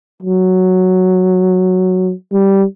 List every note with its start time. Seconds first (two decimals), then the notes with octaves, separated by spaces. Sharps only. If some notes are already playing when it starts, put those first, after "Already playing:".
0.23 F#3
2.32 G3